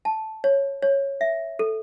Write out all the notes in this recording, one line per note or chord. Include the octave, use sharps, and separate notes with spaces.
A5
C#5
C#5
E5
A4